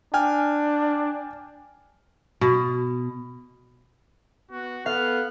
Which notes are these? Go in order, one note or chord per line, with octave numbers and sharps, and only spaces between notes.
D4 G5 G#5 F6
B2
B3 F#4
B3 A4 F5 F#6